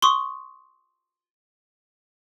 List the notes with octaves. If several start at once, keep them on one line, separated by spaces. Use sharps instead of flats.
C6 C#6 D#6